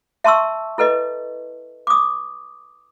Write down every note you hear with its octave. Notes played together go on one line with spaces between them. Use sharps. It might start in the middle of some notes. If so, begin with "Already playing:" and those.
E5 A5 C6 C#6 E6
E4 A4 B4 D#5
D6 D#6